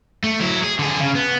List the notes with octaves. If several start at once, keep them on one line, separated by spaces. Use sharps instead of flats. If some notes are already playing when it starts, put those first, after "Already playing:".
A3
F#3 E4
G#4
D3 G#4
C#3
B3